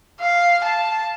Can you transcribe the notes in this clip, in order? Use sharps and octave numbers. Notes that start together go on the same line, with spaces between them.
F5
A5